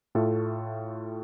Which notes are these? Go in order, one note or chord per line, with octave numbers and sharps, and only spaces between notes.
A2 A3 F4 A4